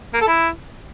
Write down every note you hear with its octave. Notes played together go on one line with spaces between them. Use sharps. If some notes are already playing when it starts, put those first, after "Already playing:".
A#3
A4
E4